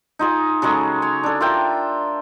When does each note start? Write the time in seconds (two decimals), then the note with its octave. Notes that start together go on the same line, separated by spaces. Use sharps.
0.19 D#4 F4 G#4
0.62 C#3 F#3 G#3 A4
1.02 C#5
1.23 D4 A4
1.41 F4 A#4 E5 G5